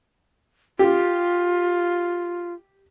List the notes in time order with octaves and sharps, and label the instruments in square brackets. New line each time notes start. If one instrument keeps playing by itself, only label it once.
[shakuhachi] F4 [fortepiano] G4